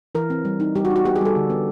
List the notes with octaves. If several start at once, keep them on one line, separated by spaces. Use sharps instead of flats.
E3 A#4
C4
G3
D#4
G3 G4
F#4
D#4
F#4
B3 G4
G#4
G3 A4
D3
B3